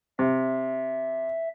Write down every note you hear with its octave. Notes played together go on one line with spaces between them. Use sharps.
C3 E5